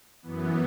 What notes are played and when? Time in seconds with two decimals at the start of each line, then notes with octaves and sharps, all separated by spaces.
0.22 F#2 E3 B3